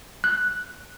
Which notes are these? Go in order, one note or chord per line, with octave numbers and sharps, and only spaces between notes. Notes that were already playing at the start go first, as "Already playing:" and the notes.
F#6